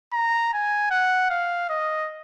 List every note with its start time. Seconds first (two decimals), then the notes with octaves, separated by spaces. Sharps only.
0.13 A#5
0.53 G#5
0.91 F#5
1.30 F5
1.69 D#5